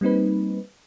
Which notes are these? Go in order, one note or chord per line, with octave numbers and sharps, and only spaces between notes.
G3 A#3 C4 D#4 B4